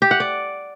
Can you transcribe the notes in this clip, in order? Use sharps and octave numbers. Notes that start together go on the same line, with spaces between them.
G4
F#5
D5